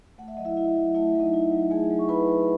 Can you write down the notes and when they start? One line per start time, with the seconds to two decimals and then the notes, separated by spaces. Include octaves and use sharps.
0.18 A3 F#5
0.28 E5
0.37 F#3 D#5
0.45 E4 E5
0.57 E4
0.76 F#3
0.95 A3 E4 E5
1.14 F#3
1.20 D#4 D#5
1.34 E4
1.52 F#3
1.70 A3 G#4 G#5
1.91 F#3
1.99 C#6
2.09 E4 B4 B5
2.28 F#3